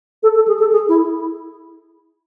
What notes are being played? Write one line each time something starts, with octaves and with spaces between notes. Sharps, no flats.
A4
A4
G#4
A4
G#4
E4